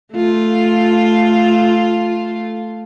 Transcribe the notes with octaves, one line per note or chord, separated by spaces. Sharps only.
A3 F4